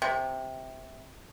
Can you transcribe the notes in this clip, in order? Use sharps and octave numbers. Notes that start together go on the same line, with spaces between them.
C3